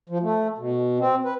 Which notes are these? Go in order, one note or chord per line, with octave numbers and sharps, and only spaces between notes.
F3
A3
B2
C4
B4